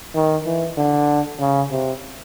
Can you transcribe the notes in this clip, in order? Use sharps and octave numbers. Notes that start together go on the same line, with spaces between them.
D#3
E3
D3
C#3
C3